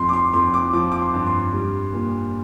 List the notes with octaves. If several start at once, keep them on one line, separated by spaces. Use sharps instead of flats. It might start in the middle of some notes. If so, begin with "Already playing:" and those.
Already playing: F2 C6
D6
C6
F2 C6
D6
F3 D6
D6
C6
G2
C6
G3
A#2